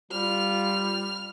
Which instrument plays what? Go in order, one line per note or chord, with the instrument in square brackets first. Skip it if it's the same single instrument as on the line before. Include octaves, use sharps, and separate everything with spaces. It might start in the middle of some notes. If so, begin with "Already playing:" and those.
[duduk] G3 [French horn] F4 [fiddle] F6